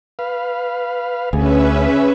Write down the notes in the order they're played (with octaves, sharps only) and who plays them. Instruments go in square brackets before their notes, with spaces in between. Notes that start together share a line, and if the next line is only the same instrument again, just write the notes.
[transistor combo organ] B4 F5
[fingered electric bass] D2 [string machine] C#4 B4 E5 [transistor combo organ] G#4